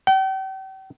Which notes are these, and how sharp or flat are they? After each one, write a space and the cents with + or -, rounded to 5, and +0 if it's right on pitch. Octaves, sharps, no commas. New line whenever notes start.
G5 -40